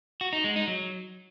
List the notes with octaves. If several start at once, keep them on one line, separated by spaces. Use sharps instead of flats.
F#4
D#4
G#3
D#4
F#3